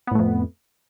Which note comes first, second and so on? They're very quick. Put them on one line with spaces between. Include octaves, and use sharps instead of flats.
B3 A2 A3 F2